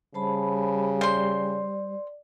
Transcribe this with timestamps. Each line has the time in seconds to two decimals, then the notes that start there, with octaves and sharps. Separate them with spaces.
0.14 C#3 G3 C5 A5 B5
1.01 C5 D5 C6